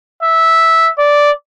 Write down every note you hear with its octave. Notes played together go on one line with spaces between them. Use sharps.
E5
D5